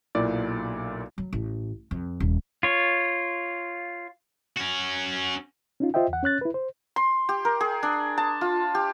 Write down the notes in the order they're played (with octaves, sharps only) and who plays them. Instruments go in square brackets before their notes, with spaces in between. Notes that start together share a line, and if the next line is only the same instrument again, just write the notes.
[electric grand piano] B1 A#2 E4 D5
[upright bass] F#3
A1
F2
D#1
[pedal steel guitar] F4 C#5
[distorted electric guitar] C#4 F#4
[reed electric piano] C#4 D#4 F4
F4 C5 D#5 E5 G5
E2 F#5
C#4 C#5 F#6 A6
E4 B4
C5
[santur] C6
G4
A#4
G#4
D4
A5
F4
G4